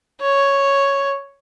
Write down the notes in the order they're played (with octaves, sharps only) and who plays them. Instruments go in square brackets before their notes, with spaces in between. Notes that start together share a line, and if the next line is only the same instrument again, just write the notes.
[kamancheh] C#5